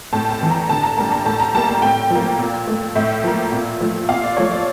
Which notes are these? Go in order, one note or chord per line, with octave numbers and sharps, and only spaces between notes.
A2 A5
A5
E3 A3
A#5
D3 A5
A#5
G3 A#3 A5
A#5
A2 A5
A#5
G3 A#3 A5
A5
A2 G5
F3 A#3
A#2
A3
A2 E5
F3 A#3
A#2
F3 A3
A#2 F5
D5
F3 A3 C#5
D5